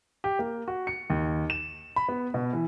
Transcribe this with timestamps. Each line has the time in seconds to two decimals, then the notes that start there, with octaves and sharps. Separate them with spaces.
0.24 G4
0.39 A#3
0.68 F#4
0.87 C#7
1.10 D#2
1.50 E7
1.96 B5
2.09 B3
2.34 B2
2.53 E3